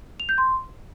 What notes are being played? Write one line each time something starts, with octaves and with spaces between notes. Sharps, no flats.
F7
G6
C6